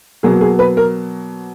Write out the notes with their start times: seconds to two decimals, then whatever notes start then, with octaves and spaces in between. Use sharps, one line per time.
0.23 B2 F#3 A#3 G#4
0.41 G#4
0.59 B4
0.77 A#4